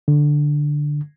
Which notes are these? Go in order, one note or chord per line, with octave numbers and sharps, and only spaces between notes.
D3